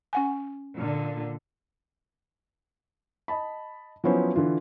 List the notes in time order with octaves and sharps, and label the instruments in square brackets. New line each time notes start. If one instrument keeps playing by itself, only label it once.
[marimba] C#4 F#5 G#5
[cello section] A#2 D3
[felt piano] D#5 A5 B5
F3 F#3 B3 C#4 E4 C5
D3 E3 F4